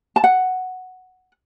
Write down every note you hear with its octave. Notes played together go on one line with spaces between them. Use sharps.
A5
F#5